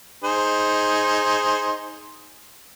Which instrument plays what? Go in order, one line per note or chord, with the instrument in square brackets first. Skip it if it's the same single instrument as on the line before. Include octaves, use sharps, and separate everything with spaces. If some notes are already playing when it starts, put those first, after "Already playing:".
[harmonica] D#4 G#4 C5